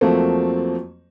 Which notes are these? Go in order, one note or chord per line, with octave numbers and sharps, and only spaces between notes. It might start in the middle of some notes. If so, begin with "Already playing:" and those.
F2 F3 F#3 A3 A#3 C4